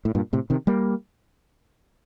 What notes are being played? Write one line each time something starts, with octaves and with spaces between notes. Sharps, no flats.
A2
G2 A#2
A2 C3
C3 D#3
G3 A#3